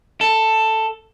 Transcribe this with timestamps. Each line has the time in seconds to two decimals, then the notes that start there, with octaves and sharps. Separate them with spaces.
0.21 A4